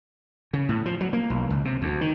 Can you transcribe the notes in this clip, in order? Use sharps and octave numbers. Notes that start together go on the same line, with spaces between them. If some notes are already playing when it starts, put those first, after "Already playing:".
C#3
A2
F3
F#3
A#3
B1
C#2
C3
D2
D#3